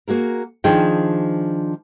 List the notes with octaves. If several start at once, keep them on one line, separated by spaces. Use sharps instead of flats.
A#3 F#4 G#4 A#4
D#3 F3 D4 G#4 G5